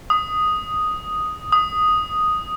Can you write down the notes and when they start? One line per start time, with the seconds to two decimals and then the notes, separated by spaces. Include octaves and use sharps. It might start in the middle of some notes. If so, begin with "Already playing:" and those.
0.10 D#6
1.52 D#6